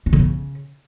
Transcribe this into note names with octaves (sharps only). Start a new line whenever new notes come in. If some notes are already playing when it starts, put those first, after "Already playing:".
D4
D3
C#3